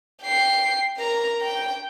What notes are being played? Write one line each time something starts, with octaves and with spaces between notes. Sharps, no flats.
G5 C7
A#4 A#5
G5